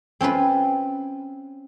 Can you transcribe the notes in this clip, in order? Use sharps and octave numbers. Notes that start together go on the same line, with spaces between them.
C4 C#4 F4 B4